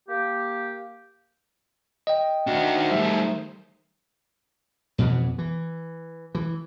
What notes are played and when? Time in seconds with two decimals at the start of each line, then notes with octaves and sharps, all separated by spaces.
0.08 A#3 G4
2.07 D#5 G5
2.47 D#3 D4 D#4 F#4 C5
2.92 G3 A3 E5
4.98 F2 B2 E3 B3
5.38 E3
6.35 E3